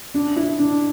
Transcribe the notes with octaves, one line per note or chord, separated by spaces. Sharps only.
D4
E4
D4